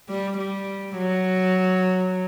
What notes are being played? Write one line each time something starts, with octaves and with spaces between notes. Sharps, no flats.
G3
G3
F#3